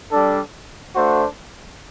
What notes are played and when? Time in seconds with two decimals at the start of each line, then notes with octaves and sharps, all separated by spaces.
0.11 G3 D4 A4
0.95 A3 D4 F#4 A4 C5